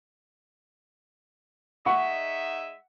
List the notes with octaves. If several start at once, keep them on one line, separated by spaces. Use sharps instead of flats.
G#3 D#4 E5 F#5 C#6